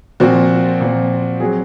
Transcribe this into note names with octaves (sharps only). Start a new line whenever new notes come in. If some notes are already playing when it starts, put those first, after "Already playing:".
A#2 F3 C4 F#4
A#2 F3 C4
F#3 C4 G#4